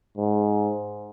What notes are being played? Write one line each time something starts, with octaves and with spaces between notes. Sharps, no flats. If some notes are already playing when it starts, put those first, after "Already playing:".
G#2